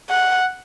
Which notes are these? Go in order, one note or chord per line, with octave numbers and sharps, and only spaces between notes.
F#5